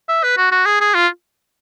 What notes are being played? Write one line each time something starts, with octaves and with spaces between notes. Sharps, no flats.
E5
B4
F#4
F#4
G#4
G#4
F4